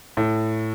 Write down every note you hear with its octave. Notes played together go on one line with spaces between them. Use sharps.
A2